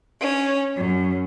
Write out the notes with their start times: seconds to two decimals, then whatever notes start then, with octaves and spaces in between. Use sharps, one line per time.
0.19 C#4
0.76 F#2